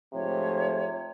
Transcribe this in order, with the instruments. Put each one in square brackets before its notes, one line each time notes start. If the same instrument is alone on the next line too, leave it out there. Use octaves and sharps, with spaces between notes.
[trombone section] G#2 F3 A3 [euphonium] C3 [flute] C#5